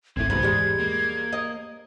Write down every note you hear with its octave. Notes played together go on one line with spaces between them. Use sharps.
D1 G#1 A2 C4 E5 G#6
F#1 C2 G#2 B2 B3 B5
E2 G#2 G3 G#3
A#3
D#5